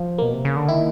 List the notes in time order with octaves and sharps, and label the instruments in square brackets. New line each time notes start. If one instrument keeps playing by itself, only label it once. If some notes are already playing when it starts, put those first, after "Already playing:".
Already playing: [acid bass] F3
[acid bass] B2 [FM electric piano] A#3
[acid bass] C3
C#3
D3
[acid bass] D#3 [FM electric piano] E4